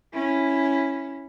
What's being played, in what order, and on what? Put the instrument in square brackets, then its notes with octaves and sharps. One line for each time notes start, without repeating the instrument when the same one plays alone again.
[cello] C#4 E4